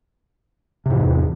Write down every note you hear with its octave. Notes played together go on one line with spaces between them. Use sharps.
E2 G#2 C3 E3